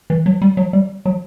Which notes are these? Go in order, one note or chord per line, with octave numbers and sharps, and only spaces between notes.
E3
F#3
G3
F#3
G3
F#3